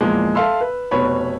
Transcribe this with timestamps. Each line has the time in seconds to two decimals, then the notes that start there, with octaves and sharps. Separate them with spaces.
0.01 E2 A#2 F3 G#3
0.35 A4 E5 F5 C6 E6
0.61 B4
0.91 F1 B2 B4 C#5 B5